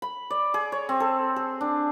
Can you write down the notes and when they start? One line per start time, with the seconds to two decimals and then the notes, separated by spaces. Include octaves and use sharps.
0.02 B5
0.30 D5
0.54 G#4
0.72 C#5
0.89 C4
1.00 A4
1.36 G#4
1.61 D4